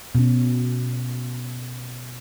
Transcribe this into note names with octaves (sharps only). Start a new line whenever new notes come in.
B2 C#4